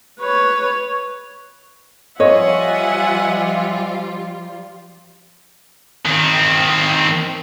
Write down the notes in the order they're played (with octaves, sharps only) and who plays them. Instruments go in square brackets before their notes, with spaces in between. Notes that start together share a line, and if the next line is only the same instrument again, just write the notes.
[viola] B4 C#5
[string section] F3 G3 F4 [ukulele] C#5 [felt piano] D#5 [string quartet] E5 F#5 G#5
[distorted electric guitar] D#3 C4